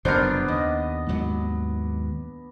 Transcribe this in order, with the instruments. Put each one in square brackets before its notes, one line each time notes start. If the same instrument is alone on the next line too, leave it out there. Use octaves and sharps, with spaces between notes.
[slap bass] F#1 F2 C3 [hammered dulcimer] B3 D4 [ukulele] A#4 C5
[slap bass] D#2 [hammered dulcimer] D#5
[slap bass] D#2 G#2 F#3